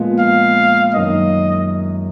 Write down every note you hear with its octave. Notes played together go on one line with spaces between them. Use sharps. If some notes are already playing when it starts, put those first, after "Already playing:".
Already playing: A#2 F3 G#3 B3 F4
F5
F#2 D#3 A#3 D#5